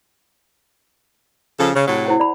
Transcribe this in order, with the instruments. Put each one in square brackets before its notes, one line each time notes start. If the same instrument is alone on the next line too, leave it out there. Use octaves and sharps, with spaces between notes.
[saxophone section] C#3 F3 A4
C#3
A2 C3 F#3
[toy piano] E4 C5 F#5
D5 B5